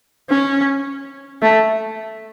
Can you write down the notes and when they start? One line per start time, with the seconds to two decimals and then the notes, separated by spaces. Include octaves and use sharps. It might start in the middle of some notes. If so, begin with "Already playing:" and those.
0.30 C#4
1.42 A3